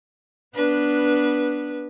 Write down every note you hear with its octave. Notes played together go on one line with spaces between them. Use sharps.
B3 D4 B4